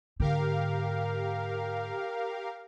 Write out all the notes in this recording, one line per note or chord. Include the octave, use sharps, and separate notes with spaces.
G#2 D3 G4 A#4 F5